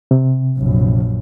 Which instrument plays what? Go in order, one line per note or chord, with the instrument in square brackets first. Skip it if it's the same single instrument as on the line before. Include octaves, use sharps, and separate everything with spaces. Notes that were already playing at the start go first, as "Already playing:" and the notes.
[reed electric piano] C3
[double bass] A#1 F#2